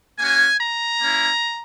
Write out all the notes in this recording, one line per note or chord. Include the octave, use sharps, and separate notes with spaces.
A#3 C#4 F#4 G#5
A#5
A#3 C#4 E4